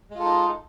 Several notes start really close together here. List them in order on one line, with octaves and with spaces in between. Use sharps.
G#3 F4 A4 D#4